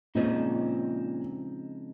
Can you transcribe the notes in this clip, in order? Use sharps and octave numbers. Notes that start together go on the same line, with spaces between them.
A#2 C#3 F3 G#3 C4 D#4